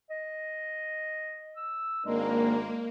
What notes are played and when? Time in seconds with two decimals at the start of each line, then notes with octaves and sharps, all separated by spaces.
0.10 D#5
1.57 E6
2.05 G#1 G#3 A#3 D4 A#4